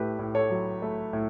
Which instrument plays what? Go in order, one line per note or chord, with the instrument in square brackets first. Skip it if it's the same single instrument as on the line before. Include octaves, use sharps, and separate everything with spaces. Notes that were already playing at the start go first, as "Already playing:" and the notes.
Already playing: [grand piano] A2 A3 G4 B4
A2
A4 C#5
F#3
A3
A2